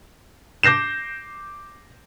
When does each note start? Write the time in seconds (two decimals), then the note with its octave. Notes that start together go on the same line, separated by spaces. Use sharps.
0.63 D6 G6 A#6 C7 E7